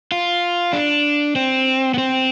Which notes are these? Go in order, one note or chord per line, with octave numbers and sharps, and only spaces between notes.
F4
D4
C4
B3
C4